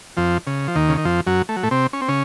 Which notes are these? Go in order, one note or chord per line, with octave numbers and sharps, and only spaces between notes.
F2 F3
C#3
F3
D#2 D#3
C#3
D#3
F2 F3
F#2 F#3
A3
F#3
A2 A3
C3 C4
C#4
C4
C#3 C#4